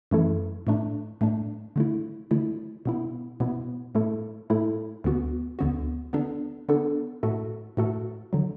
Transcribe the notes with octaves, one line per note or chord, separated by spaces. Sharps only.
F#2 E3 A3 E4 A4
A2 A3 D4
A2 A3 D4
D3 A3 E4
D3 A3 E4
B2 B3 E4
B2 B3 E4
A2 A3 E4 A4
A2 A3 E4 A4
D2 D3 B3 F#4
D2 D3 B3 F#4
D3 B3 D4 A4
D3 B3 D4 A4
A2 A3 F#4 A4
A2 A3 F#4 A4
D3 F#3